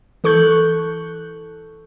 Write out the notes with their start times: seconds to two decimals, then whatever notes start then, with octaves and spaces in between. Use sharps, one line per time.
0.24 E3 A4 C#6 F#6 G6